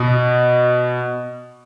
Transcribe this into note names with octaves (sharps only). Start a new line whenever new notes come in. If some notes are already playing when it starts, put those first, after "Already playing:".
Already playing: B2